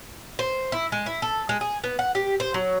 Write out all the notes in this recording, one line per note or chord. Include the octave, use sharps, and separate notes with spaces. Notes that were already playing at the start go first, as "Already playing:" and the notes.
C5
E4
G#3
E4
A4
G#3
G#4
B3
F#5
G4
C5
F#3